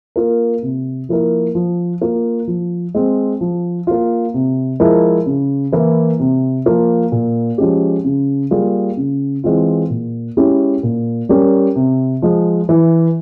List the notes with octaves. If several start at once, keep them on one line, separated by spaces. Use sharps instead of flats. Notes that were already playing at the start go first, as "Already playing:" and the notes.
A#3 F4 A#4
C3
F3 A#3 E4 A#4
F3
A#3 F4
F3
G#3 C4
F3
A#3 F4
C3
F3 G#3 E4 A#4
C#3
E3 A#3 E4
C3
F3 A#3 F4
A#2
F3 G#3 C#4 G4
C#3
G3 A#3 F4 G#4
C#3
E3 G#3 C4 F4
A#2
G#3 C#4 E4 G4
A#2
G3 C#4 G4 A#4
C3
F3 G#3
E3